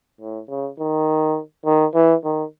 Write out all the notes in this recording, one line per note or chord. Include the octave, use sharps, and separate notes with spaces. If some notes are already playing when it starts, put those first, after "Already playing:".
A2
C#3
D#3
D#3
E3
D#3